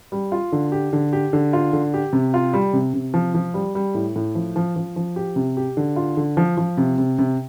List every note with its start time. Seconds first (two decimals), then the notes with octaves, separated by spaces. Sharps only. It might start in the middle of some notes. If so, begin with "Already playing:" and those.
0.12 G3
0.32 F4
0.52 D3
0.72 G4
0.93 D3
1.13 G4
1.33 D3
1.53 F4
1.73 D3
1.94 G4
2.13 C3
2.34 F4
2.54 G3
2.73 C3
2.94 C3
3.14 F3
3.35 F3
3.54 G3
3.75 G3
3.95 A2
4.16 A2
4.35 F3
4.56 F3
4.76 F3
4.96 F3
5.16 G4
5.36 C3
5.57 G4
5.77 D3
5.96 F4
6.17 D3
6.37 F3
6.57 F3
6.77 C3
6.98 C3
7.19 C3